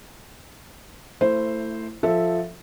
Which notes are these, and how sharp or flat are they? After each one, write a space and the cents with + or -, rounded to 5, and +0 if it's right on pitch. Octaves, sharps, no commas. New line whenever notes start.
A3 +25 E4 +5 C5 +0
F3 +0 A4 +0 E5 -10